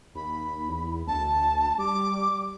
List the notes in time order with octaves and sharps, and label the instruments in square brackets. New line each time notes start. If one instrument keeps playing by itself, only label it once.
[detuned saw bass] D#2 [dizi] B5
[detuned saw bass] E2
[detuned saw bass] D2 [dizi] A5
[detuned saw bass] G3 [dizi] D6